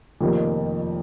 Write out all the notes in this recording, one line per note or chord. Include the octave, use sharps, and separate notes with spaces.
F1 F2 D#3 A#3 G4